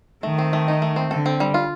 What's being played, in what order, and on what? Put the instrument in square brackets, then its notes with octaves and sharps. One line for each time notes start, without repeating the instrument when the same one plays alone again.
[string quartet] D#3 [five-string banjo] A3
[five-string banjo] C4
A3
D#4
A3
C4
[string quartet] D3 [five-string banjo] A4
[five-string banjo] C4
G3
F4